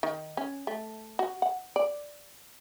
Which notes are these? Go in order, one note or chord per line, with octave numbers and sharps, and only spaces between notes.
D#3
C#4
A3
F#4
F#5
D5